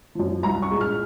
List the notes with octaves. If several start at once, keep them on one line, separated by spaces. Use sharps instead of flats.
F#2 F3
C2 A#5
C#6
A#2 G#3
F6